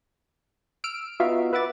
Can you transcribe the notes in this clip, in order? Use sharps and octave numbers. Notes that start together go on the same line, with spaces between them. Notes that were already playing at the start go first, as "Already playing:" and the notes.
E6 F6 D7
B3 D#4 F4 F#4 E5 F5
B4 E5 F#5 D6 A6